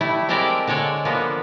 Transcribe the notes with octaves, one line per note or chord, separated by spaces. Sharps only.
G3 A3 E4
G#3 C4 G4 A4 A#4 D5
D3 G#3 A4 C#5 D5
D3 F3 A#3 B3